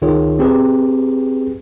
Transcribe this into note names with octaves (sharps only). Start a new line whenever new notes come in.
C#2 D#3 F4 G#4 C#5
C4 G4 G#4 B4